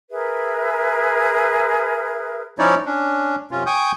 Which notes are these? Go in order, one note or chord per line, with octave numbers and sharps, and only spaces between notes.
G#4 A#4 B4 E5
F3 C#4 D#4 E4 C#5 D5
C#4 D4
F#2 C3 C#4 F4
G5 G#5 C#6 D#6 G6